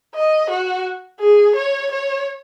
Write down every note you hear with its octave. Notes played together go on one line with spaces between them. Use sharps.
D#5
F#4
G#4
C#5
C#5